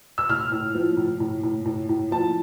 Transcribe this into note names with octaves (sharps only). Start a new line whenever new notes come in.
E6
A2 F6
A2
F3
A2
A2
A2
A2
A2
F3 A5